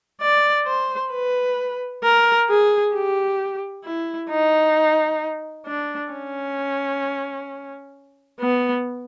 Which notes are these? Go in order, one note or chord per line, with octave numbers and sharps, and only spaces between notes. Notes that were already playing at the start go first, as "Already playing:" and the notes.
D5
C5
B4
A#4
G#4
G4
E4
D#4
D4
C#4
B3